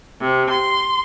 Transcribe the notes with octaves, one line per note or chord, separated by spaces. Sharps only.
C3
C6